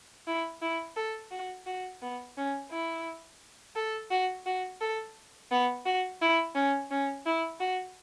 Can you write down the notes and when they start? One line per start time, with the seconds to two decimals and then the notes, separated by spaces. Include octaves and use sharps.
0.27 E4
0.62 E4
0.97 A4
1.31 F#4
1.66 F#4
2.02 B3
2.37 C#4
2.71 E4
3.76 A4
4.11 F#4
4.46 F#4
4.81 A4
5.51 B3
5.85 F#4
6.21 E4
6.55 C#4
6.91 C#4
7.26 E4
7.60 F#4